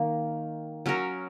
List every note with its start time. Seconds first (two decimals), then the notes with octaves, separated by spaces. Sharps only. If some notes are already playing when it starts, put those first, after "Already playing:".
Already playing: D#3 A#3
0.86 F#3 C#4 A#4